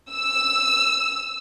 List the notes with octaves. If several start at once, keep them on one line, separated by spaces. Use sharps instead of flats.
E6